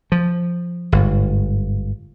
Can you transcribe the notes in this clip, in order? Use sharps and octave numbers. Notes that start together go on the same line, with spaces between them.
F3
G1 G#2